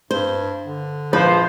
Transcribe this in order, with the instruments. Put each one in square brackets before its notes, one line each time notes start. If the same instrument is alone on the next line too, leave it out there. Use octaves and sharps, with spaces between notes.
[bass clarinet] G2 [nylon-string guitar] C5
[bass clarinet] D3
[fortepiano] A#1 [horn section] F3 C5 [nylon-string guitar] B4